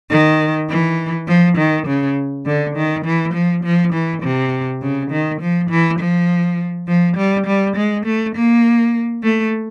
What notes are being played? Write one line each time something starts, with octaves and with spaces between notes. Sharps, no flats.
D#3
E3
F3
D#3
C#3
D3
D#3
E3
F3
F3
E3
C3
C#3
D#3
F3
E3
F3
F3
G3
G3
G#3
A3
A#3
A3